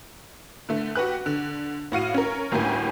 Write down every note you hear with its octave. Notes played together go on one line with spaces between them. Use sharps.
D3 A3
F#4 G4 B4 F#6
D3
A2 F#4 F5 D#7
C#4 A#4
G1 D2 A2 A#3 G4 G#5